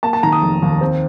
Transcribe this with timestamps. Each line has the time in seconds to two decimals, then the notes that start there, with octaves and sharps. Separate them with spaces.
0.03 A#3 A5
0.13 A5
0.23 D#3 A#5
0.32 D#6
0.42 F1
0.62 D#2
0.81 C4